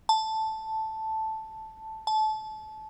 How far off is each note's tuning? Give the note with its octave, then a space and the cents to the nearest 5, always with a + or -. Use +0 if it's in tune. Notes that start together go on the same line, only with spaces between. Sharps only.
A5 +0
A5 -25